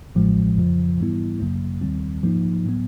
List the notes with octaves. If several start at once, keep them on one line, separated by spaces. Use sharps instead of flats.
A1 A2 F3 G#3
F2 C#3 F3
G#2 E3 G3 B3 E4
G#1 F#2 C#3 F#3 A#3
D#2 D#3 G3 C4
G#2 F3 A#3 D#4
A2 F#3 B3